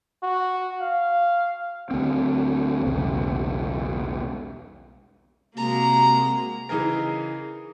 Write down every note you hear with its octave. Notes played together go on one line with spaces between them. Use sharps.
F#4
F5
D2 C4
B1 E2 C#3
C3 G#3 A#3 F#4 A#5
C#3 E3 D#4 G#4 A#4